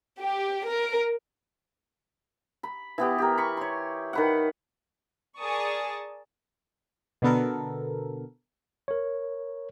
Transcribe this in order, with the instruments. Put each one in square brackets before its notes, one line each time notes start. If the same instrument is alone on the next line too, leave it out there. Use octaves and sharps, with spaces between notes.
[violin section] G4
A#4
[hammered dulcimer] B5
E3 B3 G4
G4 A#4
B5 C#6
C#5 C6
D#3 B4 F#5
[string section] G#4 A#4 D5 A5 C#6 D#6
[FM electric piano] B2 D3 B3 A4 A#4
[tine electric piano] A#4 C#5